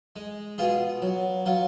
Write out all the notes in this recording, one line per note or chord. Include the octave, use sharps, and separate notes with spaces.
G#3
B2 F4 G#4
F#3
F#3 F4